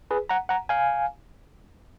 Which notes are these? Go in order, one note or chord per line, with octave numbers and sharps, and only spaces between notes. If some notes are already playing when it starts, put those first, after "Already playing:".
G#4 B4
F#5 A#5
F#5 A#5
F5 G#5